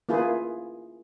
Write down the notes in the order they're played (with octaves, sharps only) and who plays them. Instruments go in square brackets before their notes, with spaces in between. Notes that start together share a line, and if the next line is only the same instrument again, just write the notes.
[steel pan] A#3 E4 F4 G#4 B4